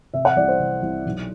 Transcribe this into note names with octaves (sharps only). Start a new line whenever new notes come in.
C3 E5
F#5
C2 D5
C5
C3
C2
B1